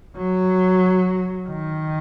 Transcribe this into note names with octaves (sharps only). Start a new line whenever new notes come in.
F#3
D#3